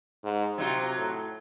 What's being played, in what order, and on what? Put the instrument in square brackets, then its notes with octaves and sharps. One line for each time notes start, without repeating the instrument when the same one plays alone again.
[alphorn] G#2
[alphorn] C3 [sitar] F#3 D#4 F4
[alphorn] A2